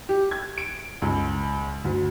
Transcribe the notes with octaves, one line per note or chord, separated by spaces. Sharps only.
G4
G#6
D7
C#2
D2